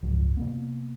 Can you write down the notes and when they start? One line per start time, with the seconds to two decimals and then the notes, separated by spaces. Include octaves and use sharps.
0.03 G#1 C#2 F#2 F3
0.37 C3 A#3 B3